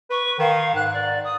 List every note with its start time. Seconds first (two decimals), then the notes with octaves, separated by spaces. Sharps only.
0.10 B4 C#6
0.39 D#3 F5
0.75 G#2 F#6
0.93 D5
1.24 D#6